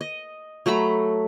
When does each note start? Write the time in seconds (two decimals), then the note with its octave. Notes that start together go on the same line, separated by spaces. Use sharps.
0.01 D#5
0.66 F#3 A3 A#5 B5